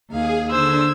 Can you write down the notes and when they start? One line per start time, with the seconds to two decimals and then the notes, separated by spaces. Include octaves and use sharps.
0.10 D#2 G#4 F5
0.51 D3 C5 E6 G#6